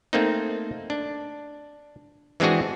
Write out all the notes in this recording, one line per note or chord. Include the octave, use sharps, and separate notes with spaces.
A3 A#3 C4 D#4
D4
E3 G#3 C4 D4 F#4 G#4